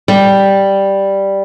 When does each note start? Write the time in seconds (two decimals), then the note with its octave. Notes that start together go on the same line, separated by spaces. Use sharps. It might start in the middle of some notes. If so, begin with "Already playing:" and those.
0.08 G3